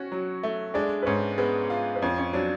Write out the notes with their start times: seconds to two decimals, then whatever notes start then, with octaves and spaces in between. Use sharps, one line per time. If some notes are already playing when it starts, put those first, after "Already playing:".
Already playing: C#4 F#4 C#5
0.12 F#3
0.43 A3
0.74 G#3 D4 D5
1.02 B4
1.06 G#2 C#4 C#5
1.38 G#3 B3 B4
1.70 F4
1.96 B4
2.02 F2 C#4 C#5
2.17 C#4 C#5
2.33 F#3 D4 D5